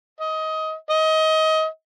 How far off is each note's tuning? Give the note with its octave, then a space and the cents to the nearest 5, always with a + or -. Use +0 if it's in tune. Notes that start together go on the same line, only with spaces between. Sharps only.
D#5 +20
D#5 +25